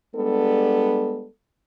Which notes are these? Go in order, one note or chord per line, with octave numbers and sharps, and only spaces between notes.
G3 G#3 B3 D4 A4